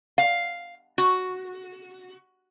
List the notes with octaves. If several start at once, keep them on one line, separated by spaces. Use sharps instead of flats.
F5
F#4